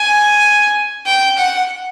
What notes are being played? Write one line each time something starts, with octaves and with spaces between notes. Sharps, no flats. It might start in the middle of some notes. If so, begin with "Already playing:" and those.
Already playing: G#5
G5
F#5